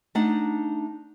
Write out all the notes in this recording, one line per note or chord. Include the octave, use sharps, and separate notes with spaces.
A3 D4 D#4 F#5